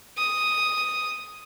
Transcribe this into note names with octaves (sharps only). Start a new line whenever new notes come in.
D#6